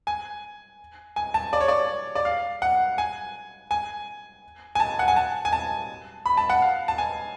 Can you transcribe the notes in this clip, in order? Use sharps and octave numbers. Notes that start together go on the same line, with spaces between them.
G#5
G#5
A5
D5
C#5
D5
D5
F5
F#5
G#5
G#5
G#5
A5
F#5
G#5
A5
G#5
A5
B5
A5
F#5
F5
A5
G#5